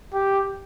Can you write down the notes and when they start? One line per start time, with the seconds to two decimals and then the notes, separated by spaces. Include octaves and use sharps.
0.13 G4